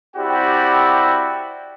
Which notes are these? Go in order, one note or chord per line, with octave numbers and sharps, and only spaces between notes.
C4 E4 F#4 G4 D5 G5